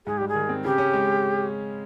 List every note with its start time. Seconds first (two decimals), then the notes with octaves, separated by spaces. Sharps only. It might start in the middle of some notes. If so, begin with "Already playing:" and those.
0.06 G#2 G#4
0.18 G3 G4
0.28 G#4
0.35 D#3
0.49 C4
0.64 C#3 G4
0.78 C#4
0.93 G#3